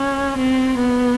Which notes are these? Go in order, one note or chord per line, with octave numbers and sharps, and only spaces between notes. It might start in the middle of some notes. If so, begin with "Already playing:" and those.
Already playing: C#4
C4
B3